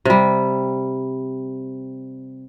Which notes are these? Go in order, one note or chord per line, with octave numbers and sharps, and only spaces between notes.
C3 G3